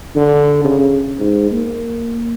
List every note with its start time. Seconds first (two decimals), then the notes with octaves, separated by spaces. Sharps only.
0.16 D3
0.65 C#3
1.20 G#2
1.52 A#3